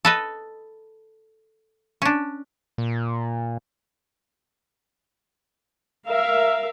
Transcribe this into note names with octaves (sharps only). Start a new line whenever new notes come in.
A4 B4 D#5
C#4 D4
A#2
A#4 E5 F5